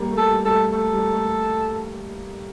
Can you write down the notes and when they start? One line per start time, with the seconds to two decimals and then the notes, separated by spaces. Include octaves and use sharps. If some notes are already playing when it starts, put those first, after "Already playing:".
Already playing: G3 A#3
0.11 A3
0.17 A4
0.31 G3
0.45 G3 A4
0.52 A3
0.72 A3 A4
0.93 G3
1.14 A3